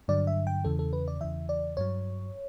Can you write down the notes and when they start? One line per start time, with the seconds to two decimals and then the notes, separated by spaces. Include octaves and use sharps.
0.08 G2 D3 F#3 D5
0.27 E5
0.47 G5
0.65 E2 C#3 E3 A4
0.79 A4
0.93 B4
1.08 D5
1.21 E2 C#3 E3 E5
1.49 D5
1.77 G2 F#3 C#5